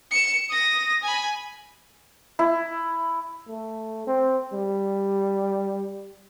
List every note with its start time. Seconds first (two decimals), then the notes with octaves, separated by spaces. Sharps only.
0.11 C#7 E7
0.50 D#6 A#6
1.03 G#5 B5
2.39 E4
3.48 A3
4.07 C4
4.53 G3